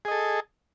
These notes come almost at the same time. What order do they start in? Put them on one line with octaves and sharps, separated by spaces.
G#4 D#5 A4